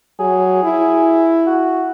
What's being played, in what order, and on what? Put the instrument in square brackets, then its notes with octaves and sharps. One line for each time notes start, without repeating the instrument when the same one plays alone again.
[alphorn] F#3 [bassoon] G#4
[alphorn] E4
[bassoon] F#4